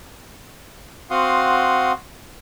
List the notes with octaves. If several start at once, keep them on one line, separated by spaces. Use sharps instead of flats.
C4 F#4 F5 F#5 C6 D#6